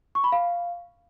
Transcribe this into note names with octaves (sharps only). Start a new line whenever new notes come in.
C#6
B5
F5